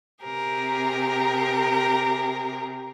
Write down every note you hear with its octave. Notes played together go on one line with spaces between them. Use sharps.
C3 G4 G#4 A#4